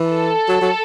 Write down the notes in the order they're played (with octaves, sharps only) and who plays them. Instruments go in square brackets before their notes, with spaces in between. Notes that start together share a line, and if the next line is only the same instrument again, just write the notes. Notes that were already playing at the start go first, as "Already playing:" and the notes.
Already playing: [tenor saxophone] E3
[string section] A4
[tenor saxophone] F#3
F#3